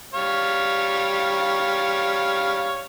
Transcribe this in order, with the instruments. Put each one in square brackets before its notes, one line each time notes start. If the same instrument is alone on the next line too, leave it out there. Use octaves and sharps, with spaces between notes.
[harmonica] G3 C#5 F5